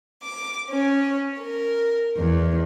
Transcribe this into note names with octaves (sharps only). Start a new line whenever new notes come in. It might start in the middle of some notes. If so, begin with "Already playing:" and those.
D6
C#4
A#4
E2